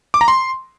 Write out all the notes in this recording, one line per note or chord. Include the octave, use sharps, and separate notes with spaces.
D6
A#5
C6